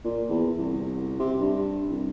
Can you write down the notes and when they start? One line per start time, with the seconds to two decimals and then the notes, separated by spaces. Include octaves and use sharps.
0.05 A#2
0.30 E2
0.58 C2
1.19 C3
1.41 G2
1.89 C2